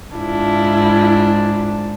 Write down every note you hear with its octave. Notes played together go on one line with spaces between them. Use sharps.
G#2 D4 E4 F4